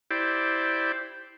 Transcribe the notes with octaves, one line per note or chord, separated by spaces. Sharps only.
E4 G4 C5 D5